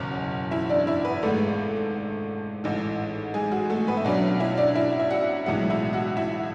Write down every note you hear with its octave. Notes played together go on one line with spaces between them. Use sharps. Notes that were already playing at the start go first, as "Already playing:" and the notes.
Already playing: F#1 E2 B2 C#4 C#5
E4 E5
D4 D5
E4 E5
B3 B4
G#1 G#2 G#3 A3 A4
A1 G#2 E3
G#3 G#4
F#4
A3 A4
B3 B4
E5
B1 B2 F#3 C#4 D4 D5
E4 E5
D4 D5
E4 E5
E5
F#4 F#5
B1 A2 E3 G#3 B3 F#4 F#5
E4 E5
F#4 F#5
E4 E5